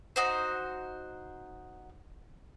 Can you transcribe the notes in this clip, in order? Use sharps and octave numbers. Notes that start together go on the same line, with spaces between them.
D#4 F#4 C5